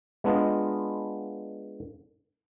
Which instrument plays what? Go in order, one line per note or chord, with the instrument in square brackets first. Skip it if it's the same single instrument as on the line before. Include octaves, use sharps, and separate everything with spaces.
[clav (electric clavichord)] G#3 B3 D4 F4 D#5